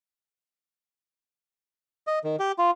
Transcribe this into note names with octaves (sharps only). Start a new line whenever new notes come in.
D#5
D#3
G4
F4